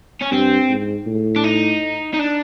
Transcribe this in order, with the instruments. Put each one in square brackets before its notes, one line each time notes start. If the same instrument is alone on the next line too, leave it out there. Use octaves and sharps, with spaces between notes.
[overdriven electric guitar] C#4
[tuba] G2 [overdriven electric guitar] C4
[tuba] G#2
A2
[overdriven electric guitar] D4
D#4
D#4
D4